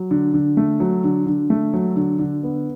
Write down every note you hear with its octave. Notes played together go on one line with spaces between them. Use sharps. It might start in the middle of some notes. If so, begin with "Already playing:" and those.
Already playing: F#3
D3
D3
A3
F#3
D3
D3
A3
F#3
D3
D3
B3